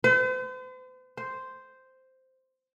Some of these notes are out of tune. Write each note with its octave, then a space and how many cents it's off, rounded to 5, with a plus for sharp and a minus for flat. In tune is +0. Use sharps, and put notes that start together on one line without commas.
C5 -45
C5 -5